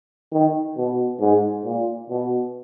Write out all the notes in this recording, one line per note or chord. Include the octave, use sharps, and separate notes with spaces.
D#3
B2
G#2
A#2
B2